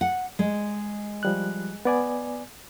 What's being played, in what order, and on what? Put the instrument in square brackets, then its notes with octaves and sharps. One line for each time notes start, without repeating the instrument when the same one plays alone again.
[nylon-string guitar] F#5
G#3
[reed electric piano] F3 G3 F#6
B3 D5 G#5